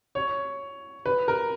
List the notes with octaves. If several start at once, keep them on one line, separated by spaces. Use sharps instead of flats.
C#5
B4
A#4